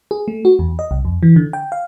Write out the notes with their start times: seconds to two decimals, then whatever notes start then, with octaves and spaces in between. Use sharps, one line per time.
0.11 G#4
0.28 A3
0.45 F#4
0.59 E2
0.79 D#5
0.91 C2
1.05 F2
1.23 E3
1.36 D3
1.53 G5
1.72 F5